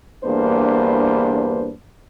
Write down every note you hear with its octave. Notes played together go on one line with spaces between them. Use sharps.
E2 G2 A#3 D4 B4 C5